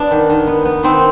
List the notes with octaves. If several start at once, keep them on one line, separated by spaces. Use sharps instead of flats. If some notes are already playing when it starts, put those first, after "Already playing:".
Already playing: B3 D4
D#3
D#3
B3
B3
D#3 C4